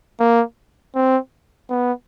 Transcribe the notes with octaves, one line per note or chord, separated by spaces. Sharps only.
A#3
C4
B3